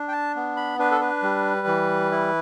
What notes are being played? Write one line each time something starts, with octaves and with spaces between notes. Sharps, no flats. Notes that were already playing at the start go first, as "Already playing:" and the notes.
Already playing: D4
G5
A5
B3
B5
D4 B4
A4
B4
G3
E3
E4